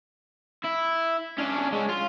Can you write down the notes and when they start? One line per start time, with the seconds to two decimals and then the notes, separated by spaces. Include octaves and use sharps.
0.64 E4
1.38 C#4 D4
1.72 G#3 C#4
1.89 F4